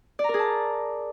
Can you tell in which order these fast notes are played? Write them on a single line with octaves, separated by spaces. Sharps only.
D5 A#5 A#4 G#4 A5